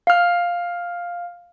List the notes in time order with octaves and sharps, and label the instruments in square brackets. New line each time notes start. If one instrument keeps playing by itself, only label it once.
[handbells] F5 F6